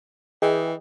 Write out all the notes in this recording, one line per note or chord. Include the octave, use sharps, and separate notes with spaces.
E3 G#4 D#5 G5